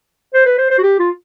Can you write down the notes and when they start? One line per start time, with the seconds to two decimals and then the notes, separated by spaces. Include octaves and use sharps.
0.34 C5
0.46 B4
0.58 C5
0.70 C5
0.78 F#4
0.83 G4
0.99 F4